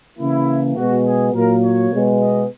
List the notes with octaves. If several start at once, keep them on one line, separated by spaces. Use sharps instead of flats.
C#3 E3 A#3 E4
B2 G#3 B3 F#4
G#4
A#2 F#3 A#3 A#4
C#5
B2 G#3 B3
D#5